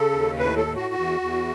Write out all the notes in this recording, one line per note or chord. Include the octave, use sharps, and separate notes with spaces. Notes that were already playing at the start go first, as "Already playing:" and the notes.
Already playing: C#3 A4
D#2
A2 B4
A4
A2
F#4
E2
E2